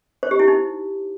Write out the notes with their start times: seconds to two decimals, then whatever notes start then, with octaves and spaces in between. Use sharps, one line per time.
0.23 C5
0.31 G4
0.39 E4
0.48 D#4